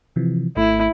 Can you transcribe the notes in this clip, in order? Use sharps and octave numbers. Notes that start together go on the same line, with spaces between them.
C3 E3 F3
G#1 A3 E4